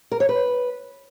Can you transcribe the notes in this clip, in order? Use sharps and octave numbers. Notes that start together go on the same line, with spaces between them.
A#4
C#5
B4